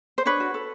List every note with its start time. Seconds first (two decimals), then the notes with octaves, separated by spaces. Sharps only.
0.18 C5
0.25 D4 B4 C#5
0.40 F#4
0.54 A4